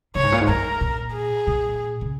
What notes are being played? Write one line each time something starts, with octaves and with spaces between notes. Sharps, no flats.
C#3 C#5
G#2
A#2
G#2
F#2 A#4
A#2
G#4
A#2
C#3